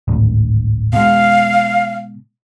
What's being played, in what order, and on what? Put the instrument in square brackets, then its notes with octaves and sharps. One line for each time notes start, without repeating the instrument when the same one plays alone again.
[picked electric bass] D1 G#1 D2
[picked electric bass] B2 G#3 [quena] F5